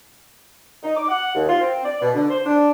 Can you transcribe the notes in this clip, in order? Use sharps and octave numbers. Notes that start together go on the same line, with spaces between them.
D#4
D6
F#5
D#2
F4
C4
D5
B2
D3
C5
D4